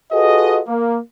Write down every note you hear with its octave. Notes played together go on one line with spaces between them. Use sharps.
F4 F#4 G#4 A4 B4 D#5
A#3